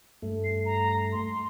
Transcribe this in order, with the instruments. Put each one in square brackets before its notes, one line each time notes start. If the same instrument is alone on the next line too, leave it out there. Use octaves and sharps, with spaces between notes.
[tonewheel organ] G2 A3
[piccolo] C7
A#5
C6